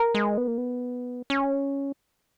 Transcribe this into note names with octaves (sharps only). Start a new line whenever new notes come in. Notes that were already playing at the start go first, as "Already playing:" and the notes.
Already playing: A#4
G#3
B3
A#3
B3
C#4